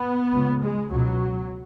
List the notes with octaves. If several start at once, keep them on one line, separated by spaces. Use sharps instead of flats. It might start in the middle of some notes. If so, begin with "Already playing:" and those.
Already playing: B3
C#2 C#3
G#3
C#2 B2 F#3